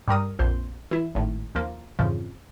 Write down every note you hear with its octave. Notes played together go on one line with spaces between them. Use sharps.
G2 G3 A#4 D#6
A#1 F2 C5
E3 E4
G#1 A2
D#2 F3 A#3
F2 G#2 C#3 E3 F3